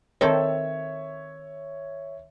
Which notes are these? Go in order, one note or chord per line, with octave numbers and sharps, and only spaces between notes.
D#3 C4 A4 C#5 E5